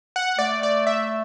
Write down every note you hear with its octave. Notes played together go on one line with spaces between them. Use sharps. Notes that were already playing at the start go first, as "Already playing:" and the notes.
F#5
A3 D5
D5
E5